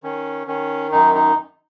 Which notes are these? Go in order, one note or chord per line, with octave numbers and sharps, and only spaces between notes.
D#3 C#4
D#3 C#4
F#2 D#4
D#4